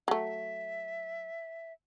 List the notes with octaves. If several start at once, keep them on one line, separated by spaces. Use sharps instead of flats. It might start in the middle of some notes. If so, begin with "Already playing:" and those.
F#3 A3 E5